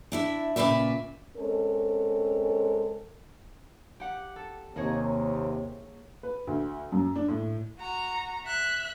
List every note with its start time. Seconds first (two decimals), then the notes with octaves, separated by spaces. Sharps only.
0.12 D4 E4 E5
0.56 A#2 C#3 B4 D5 E5
1.37 G#3 C4 C#4 A4 A#4
4.00 G4 F#5
4.36 A4
4.76 D#2 C3 A#3 G#4 C#5
6.23 B4
6.47 D2
6.92 F#2
7.16 D4
7.28 A2
7.79 F#4 A#5
8.46 E5 F#6